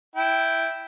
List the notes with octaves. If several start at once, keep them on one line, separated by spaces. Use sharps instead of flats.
E4 G5